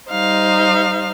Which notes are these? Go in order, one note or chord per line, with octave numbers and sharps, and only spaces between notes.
G3 D#4 C5 F5